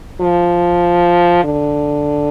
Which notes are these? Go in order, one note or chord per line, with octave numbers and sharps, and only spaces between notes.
F3
D3